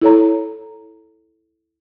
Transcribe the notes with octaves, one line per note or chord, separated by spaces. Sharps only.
E4 A4 C#5 A#5